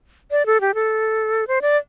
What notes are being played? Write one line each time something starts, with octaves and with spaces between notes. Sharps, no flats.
D5
A4
G4
A4
C5
D5